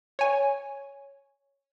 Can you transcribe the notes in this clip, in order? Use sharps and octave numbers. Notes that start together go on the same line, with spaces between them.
C#5 G#5